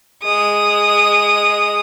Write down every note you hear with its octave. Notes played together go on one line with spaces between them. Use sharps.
G#3 D#6